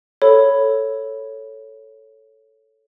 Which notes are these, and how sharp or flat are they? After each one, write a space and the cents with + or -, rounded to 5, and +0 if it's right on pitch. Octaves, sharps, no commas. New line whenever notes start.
A4 +0 C#5 +0 B5 +0